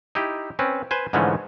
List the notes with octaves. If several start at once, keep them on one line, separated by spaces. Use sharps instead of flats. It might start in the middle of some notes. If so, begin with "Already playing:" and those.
D#4 E4 G4
C4 C#4 B4
B4 C5 G#5
G#2 D3 E3 F3 A3 C#4